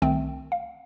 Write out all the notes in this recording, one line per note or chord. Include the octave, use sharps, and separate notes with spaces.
C2 D#3 A3 C4 G5
F5